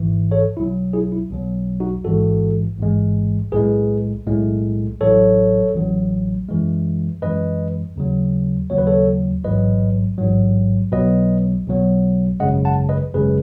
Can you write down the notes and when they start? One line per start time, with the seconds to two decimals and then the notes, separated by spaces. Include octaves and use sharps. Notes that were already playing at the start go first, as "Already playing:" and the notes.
Already playing: G#1 G#2 E3
0.31 A4 C#5
0.57 B1 B2 F#3 E4
0.93 E4 G#4
1.12 E4
1.31 B1 B2 F#3
1.80 D#4 F#4
2.04 A1 G#2 E3 G#3 F#4 A4
2.78 A1 G#2 E3 G#3
3.52 B1 A2 G#3 G#4 B4
4.26 B1 A2 G#3
5.00 A1 A2 F#3 A4 C#5
5.74 A1 A2 F#3
6.48 F#2 E3 G#3
7.22 F#2 E3 G#3 B4 D#5
7.96 D#2 C#3 F#3
8.70 D#2 C#3 F#3 C#5
8.78 B4
8.87 A4 C#5
9.44 A1 G#2 F#3 B4 D#5
10.18 A1 G#2 F#3
10.92 B1 B2 F#3 B4 D#5
11.66 B1 B2 F#3
12.40 G#1 F#2 C#3 G#3 D#5 F#5
12.65 F#5 A5
12.89 B4 D#5
13.14 G#1 F#2 C#3 G#3 G#4 B4